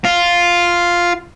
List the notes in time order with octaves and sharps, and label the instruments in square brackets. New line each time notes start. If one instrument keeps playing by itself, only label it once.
[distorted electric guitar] F4